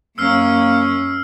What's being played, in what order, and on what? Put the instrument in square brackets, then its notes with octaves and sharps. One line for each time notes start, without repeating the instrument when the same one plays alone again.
[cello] F#2 C#4 [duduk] A#3 [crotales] E6 F6 C7